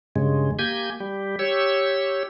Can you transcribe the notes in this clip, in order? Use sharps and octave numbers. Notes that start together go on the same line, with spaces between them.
G2 C#3 G#3
A#3 G4 G#5 G6 G#6
G3 G4
G4 C#5 E6